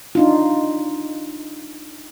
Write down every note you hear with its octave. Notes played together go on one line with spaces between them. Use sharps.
D4 D#4 F4